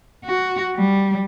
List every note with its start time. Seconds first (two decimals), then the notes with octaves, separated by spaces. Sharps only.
0.25 F#4
0.75 G3